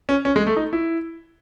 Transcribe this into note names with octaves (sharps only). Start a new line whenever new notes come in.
C#4
C#4
G#3
A3
D#4
E4